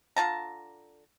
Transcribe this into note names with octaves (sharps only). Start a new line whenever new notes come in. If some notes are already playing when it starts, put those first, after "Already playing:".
D3 F4 A5 A#5